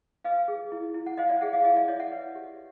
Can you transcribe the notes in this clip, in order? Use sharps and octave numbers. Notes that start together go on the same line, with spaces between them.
B4 D#5 F5
G#4
E4
E4
F#5
C5 D#5 F5
D5 E5
G#4 E5 F#5
D#5 F5
E4 D#5 F5
D5 E5
E4 C#5 D#5
E5 F#5
B4
G4